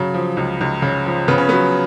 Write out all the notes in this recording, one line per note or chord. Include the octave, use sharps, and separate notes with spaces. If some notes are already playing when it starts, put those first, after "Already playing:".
Already playing: C#3 F#3
F3
C#2
C#2
C#3
F3
C#3 B3
C#4
F#3 B3